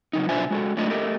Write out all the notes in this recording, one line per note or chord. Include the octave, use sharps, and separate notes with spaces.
C#3 F#3 D#4
B2 D4 F4 C5 E5 G#5
G#3 F#4 A4
F#3 A3 D4 F4 D#5
A3 G4 A#4 D#5